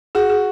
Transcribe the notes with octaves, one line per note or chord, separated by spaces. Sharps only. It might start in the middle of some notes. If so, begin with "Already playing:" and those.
F#4 G#4
G#4